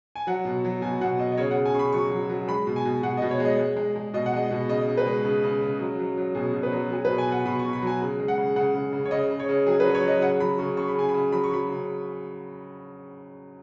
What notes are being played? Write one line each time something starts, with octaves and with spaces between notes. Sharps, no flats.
G#5
F#3 F#5
B2
F#3
B2 G#5
B2 F#5
B2 D#5
D#5
C#3 C#5
F#5
C#3
G#5
C#3 C#6
B5
F#3 C#6
F#3
F#3
G#3 B5
B2
G#5
B2
B2 F#5
B2 D#5
C#5
G#3 D#5
G#3
G#3
G#3
B2 D#5
F#5
G#3 D#5
B2
C#3 D#5
C#3
B4
G#3
C#3
C#3
C#3
F#3
F#3
F#3
B2 G#4
B2
B4
F#3
F#3 G#4
B4
B2
G#5
B2 F#5
B2 B5
C#6
B2
B5
F#3
G#5
C#3
G#3
F#5
C#3
C#3 F#5
C#3
C#3
C#5
C#3 D#5
C#3
C#5
C#3
F#3 G#4
B4
F#3
C#5
F#3 D#5
C#3 F#5
F#3 B5
C#3 C#6
C#3 C#6
B5
C#3 G#5
B5
C#3
F#3 B5
C#6
F#3 B5
C#3